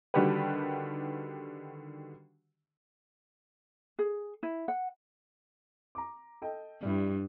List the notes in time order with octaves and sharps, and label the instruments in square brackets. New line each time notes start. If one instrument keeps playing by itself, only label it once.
[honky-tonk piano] D3 D#3 G3 F#4 G4 B4
[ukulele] G#4
E4
F#5
[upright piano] A#5 D6
A4 D#5 G5
[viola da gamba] G2 [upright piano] G3 E4